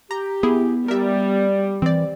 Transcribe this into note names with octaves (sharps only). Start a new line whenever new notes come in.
G4 A#5
B3 E4 G#4
G3 A#4 D5 E5
E3 C4 D5